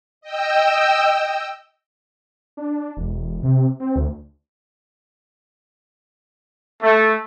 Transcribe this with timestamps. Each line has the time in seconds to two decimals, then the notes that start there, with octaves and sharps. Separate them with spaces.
0.21 D#5 G5 E6
2.57 D4
2.97 E1
3.43 C3
3.80 C4
3.96 D2
6.82 A3